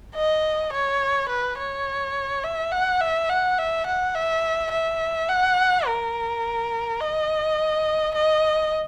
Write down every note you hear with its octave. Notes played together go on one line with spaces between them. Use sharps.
D#5
C#5
B4
C#5
E5
F#5
E5
F#5
E5
F#5
E5
E5
F#5
A#4
D#5
D#5